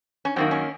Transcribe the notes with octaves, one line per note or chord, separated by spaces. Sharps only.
C#4
F#2 D#3 A#3 C4
C#4